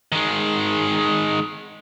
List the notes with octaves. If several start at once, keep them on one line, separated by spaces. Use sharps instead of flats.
D#3 G#3